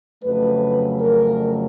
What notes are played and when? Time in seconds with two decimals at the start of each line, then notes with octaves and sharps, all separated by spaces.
0.24 F2 C#3 F#3 A3 B4
1.01 A#4